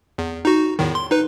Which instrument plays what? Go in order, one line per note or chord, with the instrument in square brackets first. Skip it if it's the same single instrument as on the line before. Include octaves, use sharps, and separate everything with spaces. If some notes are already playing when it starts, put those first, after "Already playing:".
[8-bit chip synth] E2
D#4 F#4
E2 A2 D#3
C6
D#4 B4